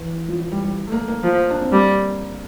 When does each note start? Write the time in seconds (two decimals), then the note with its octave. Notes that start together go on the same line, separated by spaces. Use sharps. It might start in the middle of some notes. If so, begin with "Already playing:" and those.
Already playing: E3
0.28 F3
0.40 F3
0.52 G3
0.64 G3
0.87 A3
0.92 A#3
1.08 A#3
1.24 F3
1.50 D4
1.62 C4
1.72 G3 A#3